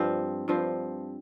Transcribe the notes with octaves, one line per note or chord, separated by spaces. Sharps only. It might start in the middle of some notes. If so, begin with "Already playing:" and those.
Already playing: G2 F3 C4
G2 F3 C4